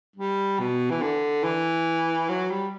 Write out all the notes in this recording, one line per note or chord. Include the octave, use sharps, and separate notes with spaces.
G3
B2
E3
D3
E3
F#3
G3